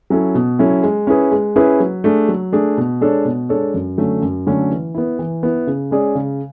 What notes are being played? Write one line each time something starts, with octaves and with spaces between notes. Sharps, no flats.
F#3 C#4 E4 A4
B2
F#3 C#4 E4 A4
G#3
C#4 E4 G#4 B4
G#3
C#4 E4 G#4 B4
F#3
A3 D4 G#4
F#3
A3 D4 G#4
B2
G#3 D4 A4 C#5
B2
G#3 D4 A4 C#5
F#2
D3 F#3 A3 C#4
F#2
D3 F#3 A3 C#4
E3
B3 E4
E3
B3 E4
C#3
G#3 C#4 G#4 D5
C#3